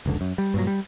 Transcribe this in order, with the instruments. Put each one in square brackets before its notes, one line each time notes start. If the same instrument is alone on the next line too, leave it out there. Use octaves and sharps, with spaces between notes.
[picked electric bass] F1 C#2 D3
F#2
G3
G2 A#2 F#3
G3